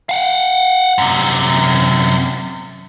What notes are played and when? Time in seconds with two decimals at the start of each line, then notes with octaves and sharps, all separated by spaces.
0.09 F5 F#5
0.98 F#2 C3